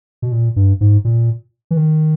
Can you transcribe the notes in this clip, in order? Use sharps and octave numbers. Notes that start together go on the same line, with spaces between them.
B2
A#2
G2
G#2
A#2
E3
D#3